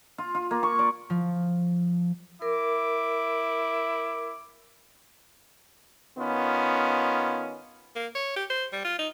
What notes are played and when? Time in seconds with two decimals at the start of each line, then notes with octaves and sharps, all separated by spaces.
0.18 F4
0.35 F4
0.51 A#3
0.63 C#6
0.79 D5
1.10 F3
2.42 E4 A#4 D6
6.18 D#3 B3 C#4 F4
7.96 A#3
8.15 C#5
8.36 G4
8.50 C5
8.73 G3
8.85 F4
8.99 D#4